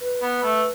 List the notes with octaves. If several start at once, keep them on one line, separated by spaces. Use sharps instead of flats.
B4
B3
A3